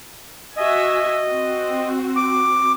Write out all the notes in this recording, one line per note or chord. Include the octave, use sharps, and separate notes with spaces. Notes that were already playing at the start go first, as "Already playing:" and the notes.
F#4 D#5 E5 G#5
C4 F#4
D6